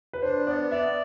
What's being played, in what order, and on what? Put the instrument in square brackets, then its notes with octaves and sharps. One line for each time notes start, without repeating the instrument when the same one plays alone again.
[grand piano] B4
[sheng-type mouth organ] D4 [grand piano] C5
[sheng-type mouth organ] B3 [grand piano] D5
[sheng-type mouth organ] D5 [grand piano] E5